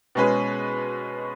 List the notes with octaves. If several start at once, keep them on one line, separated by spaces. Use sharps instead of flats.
B2 G#3 C#4 G#4 B4